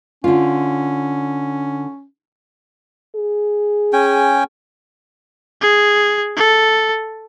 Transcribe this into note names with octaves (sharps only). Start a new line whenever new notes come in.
D3 C#4 F4
G#4
C#4 G5 G#5
G#4
A4